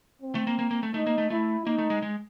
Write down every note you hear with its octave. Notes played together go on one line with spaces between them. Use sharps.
C4
A3
A#3
A#3
A#3
A3
A3 D#4
A#3
A3
A3 E4
A#3 D#4
A3
G#3
G#3